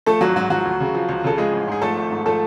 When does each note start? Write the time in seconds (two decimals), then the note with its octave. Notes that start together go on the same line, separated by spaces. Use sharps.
0.06 F3 A3 A4
0.21 G#1 F#3 F#4
0.36 G#2 F#3 F#4
0.50 F3 F#3 F#4
0.65 D2
0.80 C#3
0.95 F3
1.09 C#2
1.24 C#3 A4
1.38 F3 G#3 G#4
1.52 A1
1.67 G#2 G#4
1.82 F3 A3 A4
1.96 G#1
2.11 G#2
2.26 F3 A3 A4